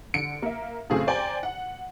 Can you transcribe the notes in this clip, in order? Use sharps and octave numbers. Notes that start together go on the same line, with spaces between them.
D3 C#7 D7
A#3 E5
F#2 A2 C#3 C4 G#4 A4
C5 D5 G5 G#5 A#5
F#5